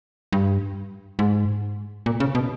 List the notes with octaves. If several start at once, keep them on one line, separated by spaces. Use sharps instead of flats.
G2
G#2
A#2
C#3
B2